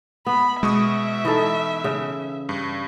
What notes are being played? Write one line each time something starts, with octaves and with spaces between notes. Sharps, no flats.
B3 B5
B2 G#3 E5 C#6 D#6
E3 D#4 A4
C#3
G2